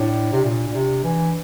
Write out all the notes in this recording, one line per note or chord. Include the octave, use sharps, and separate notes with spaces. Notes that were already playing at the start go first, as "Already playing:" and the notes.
Already playing: A2 D4
C3
A#2
A#2
C3
E3